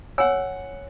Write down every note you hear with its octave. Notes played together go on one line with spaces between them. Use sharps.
C#5 F#5 G#5 E6